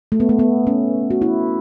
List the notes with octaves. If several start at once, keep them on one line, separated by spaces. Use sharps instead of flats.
A3
B3
A3
B3
C#4
F#4
E4